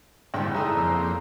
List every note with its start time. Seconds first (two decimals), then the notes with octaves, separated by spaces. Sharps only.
0.34 F#1 G#2 D3 G3 E4 F#5 G5
0.54 D#4 G#4 A4 D5 E5 A#5
0.77 F2 A#3 C4